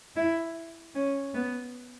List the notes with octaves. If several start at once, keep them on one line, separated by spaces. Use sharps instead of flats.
E4
C#4
B3